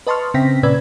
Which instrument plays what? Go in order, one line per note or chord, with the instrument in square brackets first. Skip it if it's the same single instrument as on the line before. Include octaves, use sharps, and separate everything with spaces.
[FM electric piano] B4 D#5 A5 C6 C#6 F6
C#3 C4 E5 G5 A#6 B6
A#2 C#3 B4 D5 E6 G#6